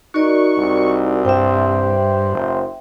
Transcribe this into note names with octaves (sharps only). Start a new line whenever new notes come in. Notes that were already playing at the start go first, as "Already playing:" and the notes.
D#4 F#4 A#4 D5 C#6
C2
G2 C5 E5 G5
F#1